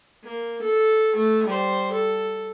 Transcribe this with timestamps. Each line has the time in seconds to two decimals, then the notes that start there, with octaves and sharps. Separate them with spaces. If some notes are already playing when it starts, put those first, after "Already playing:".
0.24 A#3
0.62 A4
1.16 A3
1.47 G3 C5
1.93 A4